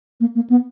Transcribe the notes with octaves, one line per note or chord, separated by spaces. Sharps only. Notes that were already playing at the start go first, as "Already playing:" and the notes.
A#3
A#3
B3